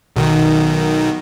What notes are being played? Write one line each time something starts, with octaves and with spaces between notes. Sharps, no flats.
B1 B2 D#3